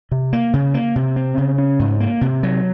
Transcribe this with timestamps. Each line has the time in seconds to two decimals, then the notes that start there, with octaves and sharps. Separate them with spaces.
0.11 C3
0.33 A#3
0.54 C#3
0.74 A#3
0.96 C3
1.16 C4
1.38 C#3
1.58 C#4
1.79 G#2
2.00 A#3
2.21 C3
2.43 F#3